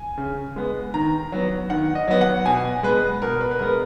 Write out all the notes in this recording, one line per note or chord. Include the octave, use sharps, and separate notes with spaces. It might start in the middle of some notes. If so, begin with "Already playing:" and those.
Already playing: G#5
C#3
G#3 B3
D#3 A#5
F#3 B3
D#3 F#5
D#5
F#3 B3
F#5
B2 G#5
G#3 B3 B4
B2 A#4
B4
B4
G#3 B3 A#4